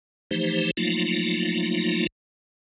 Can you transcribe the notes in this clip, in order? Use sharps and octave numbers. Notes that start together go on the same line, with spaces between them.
E3 F3 A3 D#4 G4 C5
F3 F#3 A3 A#3 D#4 F4